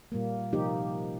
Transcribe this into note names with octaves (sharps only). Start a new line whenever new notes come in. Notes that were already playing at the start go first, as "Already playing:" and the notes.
A#2 G3 A#3
C3 F3 A#3 D#4 G4